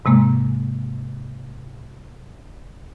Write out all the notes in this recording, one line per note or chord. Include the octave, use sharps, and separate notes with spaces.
G#2 C3 G#3 A#3